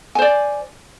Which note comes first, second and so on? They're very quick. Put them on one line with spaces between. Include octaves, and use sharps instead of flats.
G#5 C5 D5